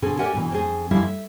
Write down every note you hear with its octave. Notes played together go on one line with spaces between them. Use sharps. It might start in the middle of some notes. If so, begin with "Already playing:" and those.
B2 D3 C4 G#4 A4
G4 A#4 D5 E5 F#5 G#5
G#2 B2 E3
F2 C4 G#4
F2 G3 G#3 E4 E5 F5
E5